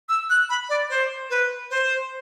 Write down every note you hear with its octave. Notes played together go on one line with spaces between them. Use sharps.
E6
F#6
B5
D5
C5
B4
C5